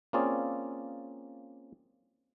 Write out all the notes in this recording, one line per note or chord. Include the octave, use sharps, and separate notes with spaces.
A#3 C4 C#4 F4 G#4 D5